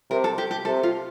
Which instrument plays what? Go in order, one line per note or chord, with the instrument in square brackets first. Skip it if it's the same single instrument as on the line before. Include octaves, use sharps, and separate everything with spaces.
[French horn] C3 [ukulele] A#4
[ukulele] A4
G4
G4
[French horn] C3 [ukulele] A4
[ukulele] F4